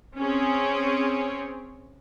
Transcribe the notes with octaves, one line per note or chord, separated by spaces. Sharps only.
C4 C#4 G#4 C#5